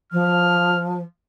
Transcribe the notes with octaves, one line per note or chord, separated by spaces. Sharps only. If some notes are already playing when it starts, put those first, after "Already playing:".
F3 F6